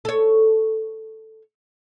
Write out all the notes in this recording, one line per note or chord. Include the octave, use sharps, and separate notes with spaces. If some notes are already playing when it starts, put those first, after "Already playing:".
A4 C#5